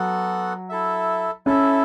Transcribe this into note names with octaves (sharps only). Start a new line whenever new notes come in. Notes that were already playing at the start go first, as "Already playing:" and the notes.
Already playing: F#3 B3 F#4 A4 F#5
E4 A4 E5
C#4 E4 A4 E5